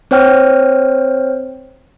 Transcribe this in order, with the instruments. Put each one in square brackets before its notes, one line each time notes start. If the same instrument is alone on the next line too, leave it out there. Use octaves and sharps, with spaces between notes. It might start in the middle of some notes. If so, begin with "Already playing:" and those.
[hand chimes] C4 C5 C#5 G5 F6